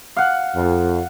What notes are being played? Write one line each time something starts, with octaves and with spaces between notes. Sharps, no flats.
F5 F#5
F2